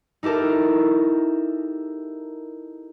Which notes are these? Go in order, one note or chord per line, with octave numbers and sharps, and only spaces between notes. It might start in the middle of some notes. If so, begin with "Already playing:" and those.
D#4 E4 G4 A4 A#4